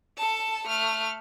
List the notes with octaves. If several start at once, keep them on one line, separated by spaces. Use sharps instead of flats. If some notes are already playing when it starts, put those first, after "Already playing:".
A4 A5
A3 F6